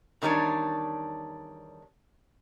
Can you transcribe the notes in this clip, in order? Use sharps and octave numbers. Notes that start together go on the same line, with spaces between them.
E2 D#3 G3 D4 C#5